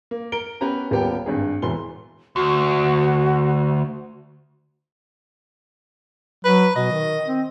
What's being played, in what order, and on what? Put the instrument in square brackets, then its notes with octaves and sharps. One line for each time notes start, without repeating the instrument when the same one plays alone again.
[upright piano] A#3
A#4 D7 G7
B3 C#4 G4 B4 A#5
D#1 B3 G4 A#4 G5
G#1 G2 G#4
E1 E3 C6 G7
[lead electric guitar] D2 [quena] F#4
[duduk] F#3 [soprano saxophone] B4
[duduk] B2 [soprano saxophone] D#5
[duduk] D#3
C4